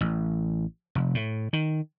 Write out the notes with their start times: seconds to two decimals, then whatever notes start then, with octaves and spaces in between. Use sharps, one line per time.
0.01 A1
0.95 F1
1.15 A2
1.53 D#3